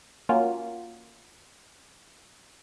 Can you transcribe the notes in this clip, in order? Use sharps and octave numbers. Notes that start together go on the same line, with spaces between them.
A#3 C#4 F4 F#4